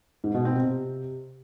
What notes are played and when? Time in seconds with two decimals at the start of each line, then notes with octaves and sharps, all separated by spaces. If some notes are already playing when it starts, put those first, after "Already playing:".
0.24 G#2
0.34 B2
0.45 C4
0.56 C3